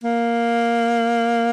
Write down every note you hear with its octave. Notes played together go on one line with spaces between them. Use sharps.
A#3